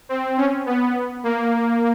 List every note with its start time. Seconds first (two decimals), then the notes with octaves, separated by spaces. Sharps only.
0.09 C4
0.37 C#4
0.66 B3
1.24 A#3